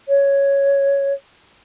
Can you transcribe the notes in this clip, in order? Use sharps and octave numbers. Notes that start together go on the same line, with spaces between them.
C#5